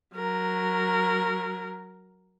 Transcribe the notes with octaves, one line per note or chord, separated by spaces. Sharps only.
F#3 A#4